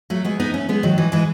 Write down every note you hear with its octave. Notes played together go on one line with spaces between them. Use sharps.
F#3 A3
G#3 B3
B3 D#4
A3 C#4
G#3 B3
D#3 F#3
E3 G#3
E3 G#3